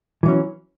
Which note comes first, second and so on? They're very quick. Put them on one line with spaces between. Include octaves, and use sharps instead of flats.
E3 F#3 C#4